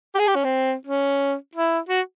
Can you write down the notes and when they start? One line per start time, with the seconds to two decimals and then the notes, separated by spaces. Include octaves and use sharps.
0.15 G4
0.19 G#4
0.28 G4
0.35 C#4
0.44 C4
0.87 C#4
1.55 E4
1.89 F#4